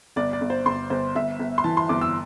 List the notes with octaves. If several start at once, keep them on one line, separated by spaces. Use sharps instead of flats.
G1 D5
D5
G1
C5
G1 C6
G1 C5
G1 E5
G1
C6
E3 A5
C6
G1 D6
E6